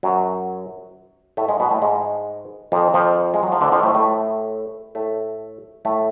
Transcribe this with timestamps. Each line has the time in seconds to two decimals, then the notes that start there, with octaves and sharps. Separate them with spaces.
0.03 F#2 F#3
1.37 A2 A3
1.48 G#2 G#3
1.60 B2 B3
1.71 A2 A3
1.82 G#2 G#3
2.72 F2 F3
2.94 F2 F3
3.34 G#3
3.43 F#3
3.52 F3
3.61 D2 D3
3.72 F2 F3
3.83 A2 A3
3.95 A2 A3
4.95 A2 A3
5.85 A2 A3